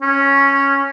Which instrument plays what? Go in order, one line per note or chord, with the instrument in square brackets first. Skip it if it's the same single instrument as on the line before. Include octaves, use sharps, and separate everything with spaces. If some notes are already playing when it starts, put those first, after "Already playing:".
[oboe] C#4